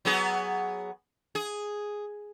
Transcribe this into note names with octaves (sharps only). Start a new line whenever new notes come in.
F#3 B3 G#4
G#4